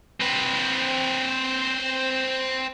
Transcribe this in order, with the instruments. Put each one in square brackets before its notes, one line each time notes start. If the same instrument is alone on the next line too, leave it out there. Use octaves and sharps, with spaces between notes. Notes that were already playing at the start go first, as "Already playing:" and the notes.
[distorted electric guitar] C4 B4